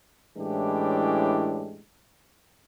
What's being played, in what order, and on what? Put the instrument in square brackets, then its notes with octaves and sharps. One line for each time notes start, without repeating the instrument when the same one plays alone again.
[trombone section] A2 E3 G#3 C#4 D4 G4